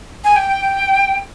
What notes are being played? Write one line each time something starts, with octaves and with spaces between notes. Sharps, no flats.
G#5
G5